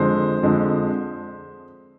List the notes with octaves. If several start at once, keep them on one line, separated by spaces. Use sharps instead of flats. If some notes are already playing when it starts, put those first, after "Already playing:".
Already playing: F2 D3 F3 G#3 C5
F2 D3 F3 G#3